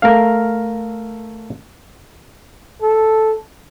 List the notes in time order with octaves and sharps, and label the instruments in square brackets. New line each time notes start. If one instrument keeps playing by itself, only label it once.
[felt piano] A3 [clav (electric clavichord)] A#4 F5
[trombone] A4